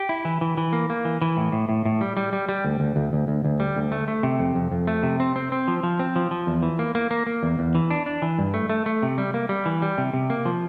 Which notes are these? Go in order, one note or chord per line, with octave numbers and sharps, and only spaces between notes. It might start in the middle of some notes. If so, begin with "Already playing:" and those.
Already playing: G4
E4
E3
E3
E3
A#3
A#3
E3
E3
A2
A2
A2
A2
G3
G3
G3
G3
D2
D2
D2
D2
D2
D2
G3
D2
A3
A3
C3
F2
F2
F2
A3
C3
C4
C4
C4
F3
F3
C4
F3
F3
E2
E3
A#3
A#3
A#3
A#3
E2
E2
E3
D4
D4
E3
G2
A3
A3
A3
C3
G3
A#3
G3
E3
G3
C3
C3
A#3
F3